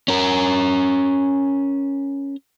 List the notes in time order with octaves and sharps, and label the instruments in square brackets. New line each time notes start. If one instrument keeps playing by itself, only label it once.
[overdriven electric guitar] C#4 A#4